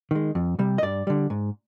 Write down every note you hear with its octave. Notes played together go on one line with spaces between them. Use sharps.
D#3 G#3
F2
C3 G3
D#5
G2 D5
D3 G3
G#2